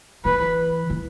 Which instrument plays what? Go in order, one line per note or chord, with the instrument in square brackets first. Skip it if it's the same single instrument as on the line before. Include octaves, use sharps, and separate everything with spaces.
[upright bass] E3 [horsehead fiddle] B4
[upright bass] E3